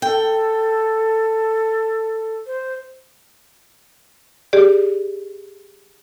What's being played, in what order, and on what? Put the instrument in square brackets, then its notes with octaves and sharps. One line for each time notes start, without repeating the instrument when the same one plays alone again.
[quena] A4 [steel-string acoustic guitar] G5
[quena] C5
[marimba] G4 G#4 D5